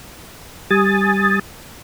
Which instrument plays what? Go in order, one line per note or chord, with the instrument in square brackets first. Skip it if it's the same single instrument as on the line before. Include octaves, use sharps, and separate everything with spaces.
[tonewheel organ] G3 G#5 D#6 A6